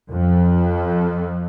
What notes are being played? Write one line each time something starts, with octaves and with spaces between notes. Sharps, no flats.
F2